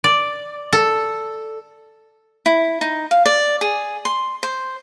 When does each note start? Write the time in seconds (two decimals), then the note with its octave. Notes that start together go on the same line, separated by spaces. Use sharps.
0.04 D5
0.73 A4
2.46 E4
2.81 D#4
3.11 F5
3.26 D5
3.61 G#4
4.05 C6
4.43 C5